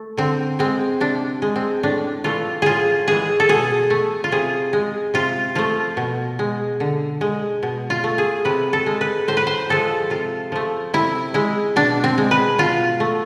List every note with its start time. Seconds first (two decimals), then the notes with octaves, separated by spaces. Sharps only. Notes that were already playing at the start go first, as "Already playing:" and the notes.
Already playing: A3
0.17 D3 C4
0.59 G#3 C4
1.00 C3 D4
1.42 G#3
1.56 C4
1.83 A2 D4
2.24 E3 A3 F4
2.62 A2 F4 G#4
3.08 E3 G#3 G#4
3.40 A4
3.49 B2 G#4
3.90 A3
4.24 F4
4.32 C3 G#4
4.73 G#3
5.14 C3 F4
5.55 F3 A3 F4
5.97 B2
6.39 G#3
6.80 D3
7.21 G#3
7.63 B2
7.90 F4
8.04 A3
8.18 G#4
8.45 C3 B4
8.73 A4
8.86 G#3
9.01 B4
9.28 A2 C5
9.37 B4
9.47 C5
9.69 F3 G#3 A4
10.10 C3 F4
10.52 F3 A3
10.94 C3 E4
11.34 G#3 E4
11.76 B2 D4
12.04 C4
12.18 G#3
12.31 B4
12.58 B2 F4
13.00 A3